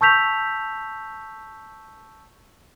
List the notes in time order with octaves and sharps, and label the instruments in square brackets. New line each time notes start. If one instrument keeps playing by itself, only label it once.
[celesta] A5 C#6 E6 G6 B6 F7